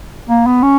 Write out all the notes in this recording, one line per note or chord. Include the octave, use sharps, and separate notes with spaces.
A#3
B3
C#4